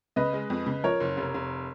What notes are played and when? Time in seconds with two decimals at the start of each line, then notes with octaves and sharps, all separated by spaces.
0.16 C#3 B4 D#5
0.33 G#3
0.50 F2
0.66 C#3
0.84 F3 A#4 C#5
1.00 F#1
1.17 F1
1.34 F1